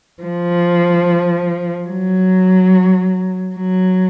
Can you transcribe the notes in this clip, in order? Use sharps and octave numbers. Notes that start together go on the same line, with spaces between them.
F3
F#3
F#3